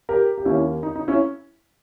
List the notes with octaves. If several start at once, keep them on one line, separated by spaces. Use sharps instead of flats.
G4 A#4
G4
D#2 D#3 A#3 C#4 E4
D#4
D#4
C#4 E4